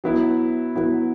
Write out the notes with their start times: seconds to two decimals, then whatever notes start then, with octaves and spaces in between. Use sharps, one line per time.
0.04 F#3 B3 E4
0.76 F#3 B3 E4